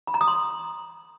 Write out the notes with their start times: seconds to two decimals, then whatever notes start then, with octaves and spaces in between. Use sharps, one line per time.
0.07 B5
0.14 A#5
0.21 D#6
0.27 C6